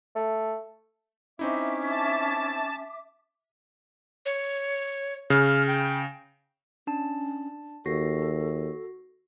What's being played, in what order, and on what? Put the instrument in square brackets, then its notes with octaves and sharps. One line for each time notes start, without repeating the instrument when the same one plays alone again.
[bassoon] A3
[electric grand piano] C4 D#4 E4 [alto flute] C#4 [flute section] E5 D6
[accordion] A5
[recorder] C#5
[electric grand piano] C#3 [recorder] F6
[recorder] G5
[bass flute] C#4 [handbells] D4 A5
[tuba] D#2 [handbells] F#4 A#6 C7 [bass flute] A4